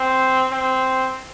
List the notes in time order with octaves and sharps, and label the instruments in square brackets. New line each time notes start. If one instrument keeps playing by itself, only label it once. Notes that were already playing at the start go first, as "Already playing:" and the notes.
Already playing: [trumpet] C4
C4